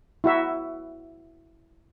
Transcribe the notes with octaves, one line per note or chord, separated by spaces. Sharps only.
E4 F#4 E5